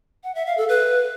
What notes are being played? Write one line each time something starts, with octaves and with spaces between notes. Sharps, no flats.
F#5
E5
F5
A4
B4